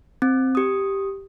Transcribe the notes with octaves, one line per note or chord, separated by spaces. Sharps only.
C4
G4 D#6